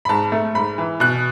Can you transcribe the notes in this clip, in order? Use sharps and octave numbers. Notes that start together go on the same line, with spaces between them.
B5
G#2 A5
A3
G#2 B5
E3
B2 F#6